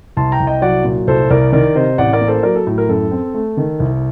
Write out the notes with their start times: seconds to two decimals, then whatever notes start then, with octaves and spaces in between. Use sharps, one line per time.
0.17 C2 A5 C6
0.32 G5 A#5
0.40 C2
0.47 D#5 G5
0.62 F#3 D5 F#5
0.84 A#2
1.07 C2 A4 C5
1.30 C2 A#4 D5
1.53 D#3 A#4 D5
1.75 C3 C5 D#5
1.98 A1 D5 F#5
2.13 A#4 D5
2.21 A#3
2.28 A4 C5
2.43 F#3 A#4 D5
2.55 A4
2.67 A2
2.78 A#4
2.89 F#2 A4
3.11 C4
3.34 A3
3.57 D#3
3.80 C2